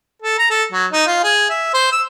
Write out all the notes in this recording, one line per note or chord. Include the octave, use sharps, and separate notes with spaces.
A4
A#5
A4
F#3
D#4
F4
G#4
E5
C5
E6